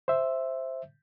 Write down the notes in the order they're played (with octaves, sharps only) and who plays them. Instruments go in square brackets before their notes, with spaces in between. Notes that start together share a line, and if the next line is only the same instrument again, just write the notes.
[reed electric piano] C5 E5